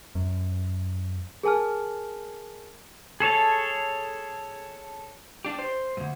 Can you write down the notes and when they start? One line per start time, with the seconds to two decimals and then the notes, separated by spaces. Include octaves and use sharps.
0.15 F#2
1.43 G#4 A#4 G#5 A5 F6
3.20 G#4 A4 C#5 A5
5.45 D4 G4
5.59 C5
5.97 D2 G2